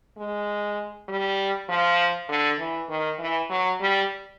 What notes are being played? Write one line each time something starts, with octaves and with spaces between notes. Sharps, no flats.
G#3
G3
F3
D3
E3
D#3
E3
F#3
G3